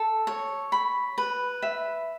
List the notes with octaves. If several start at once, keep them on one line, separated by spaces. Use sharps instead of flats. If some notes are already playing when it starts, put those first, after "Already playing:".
Already playing: A4
C#5
B5
B4
E5